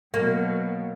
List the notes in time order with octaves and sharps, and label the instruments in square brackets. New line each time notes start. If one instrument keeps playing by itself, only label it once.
[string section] B2 F#3 [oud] A#3